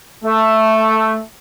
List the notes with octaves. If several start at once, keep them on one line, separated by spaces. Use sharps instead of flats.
A3